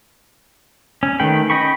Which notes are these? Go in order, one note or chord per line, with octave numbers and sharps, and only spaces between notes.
C#4
D#3 A3 B4 G5 B5
C#4 D#5 G5 B5 C#6